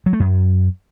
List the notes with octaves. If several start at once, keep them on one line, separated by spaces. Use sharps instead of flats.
F#3
A3
F#2